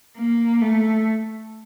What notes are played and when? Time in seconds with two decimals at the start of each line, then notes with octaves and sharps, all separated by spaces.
0.18 A#3
0.62 A3